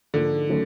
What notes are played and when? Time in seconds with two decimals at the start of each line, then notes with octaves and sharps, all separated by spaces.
0.14 G#2 D3 F3 A#3
0.49 D#3 F#3 A3 C#4